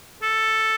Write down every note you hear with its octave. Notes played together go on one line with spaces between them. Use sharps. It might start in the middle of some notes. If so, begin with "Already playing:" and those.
A4